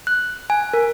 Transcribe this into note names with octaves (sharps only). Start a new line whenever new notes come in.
F#6
G#5
A#4